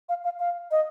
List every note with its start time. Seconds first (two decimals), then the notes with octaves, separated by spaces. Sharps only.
0.09 F5
0.24 F5
0.39 F5
0.71 D#5